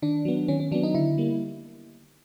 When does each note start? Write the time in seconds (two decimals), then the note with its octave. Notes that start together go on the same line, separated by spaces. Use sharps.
0.02 D#3 D4
0.25 F#3 B3
0.48 D#3 C#4
0.60 C#4
0.72 F#3 B3 D4
0.83 D#4
0.94 D3 E4
1.18 G3 A#3